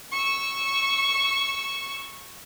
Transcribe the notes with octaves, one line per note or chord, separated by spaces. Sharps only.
C#6 E6